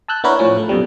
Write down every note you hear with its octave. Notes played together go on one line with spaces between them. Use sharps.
A5 E6 F#6 G6
B3 D4 E4 A#4 B4 C#5
A2 F3 C#4
A3
F#2 B2 G3